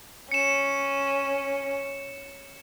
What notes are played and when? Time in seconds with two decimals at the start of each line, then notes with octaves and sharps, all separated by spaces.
0.32 C#4 C#7 E7